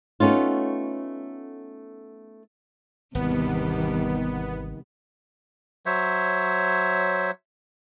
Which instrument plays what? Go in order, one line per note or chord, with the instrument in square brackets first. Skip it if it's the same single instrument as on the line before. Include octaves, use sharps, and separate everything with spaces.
[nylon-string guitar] A3 B3 C#4 D#4 F4
[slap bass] G#1 [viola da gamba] E2 C3 G3 [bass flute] D#3 [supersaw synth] B3
[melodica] F#3 C5 C#5 E5